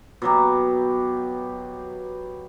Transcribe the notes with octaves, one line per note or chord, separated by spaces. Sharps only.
B2 F#3 G4